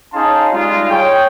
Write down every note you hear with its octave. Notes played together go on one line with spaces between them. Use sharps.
C#4 D#4 G#4 F5 A5 C6
G3 G#3 D#4 F4
G#4 C#5 G5